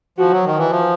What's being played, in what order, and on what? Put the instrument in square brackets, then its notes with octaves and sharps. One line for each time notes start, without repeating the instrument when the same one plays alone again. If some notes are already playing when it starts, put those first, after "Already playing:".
[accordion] F3 [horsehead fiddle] F#4
[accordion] F#3
D#3
E3
F3